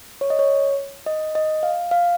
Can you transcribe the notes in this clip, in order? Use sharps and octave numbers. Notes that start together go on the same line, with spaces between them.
C#5
D#5
C#5
D#5
D#5
F5
F5